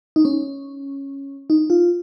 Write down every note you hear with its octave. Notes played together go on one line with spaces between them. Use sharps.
D#4
C#4
D#4
F4